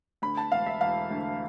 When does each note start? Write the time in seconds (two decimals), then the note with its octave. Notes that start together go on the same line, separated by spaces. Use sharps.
0.22 D2 B5
0.37 A5
0.52 E1 F5
0.66 E5
0.81 E1 F5
1.10 D2